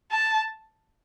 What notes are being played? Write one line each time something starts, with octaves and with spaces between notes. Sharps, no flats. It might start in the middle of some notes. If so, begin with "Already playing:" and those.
A5